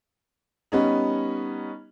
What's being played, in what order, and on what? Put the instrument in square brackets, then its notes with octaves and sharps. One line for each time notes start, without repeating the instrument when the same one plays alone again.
[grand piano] G3 B3 C#4 D#4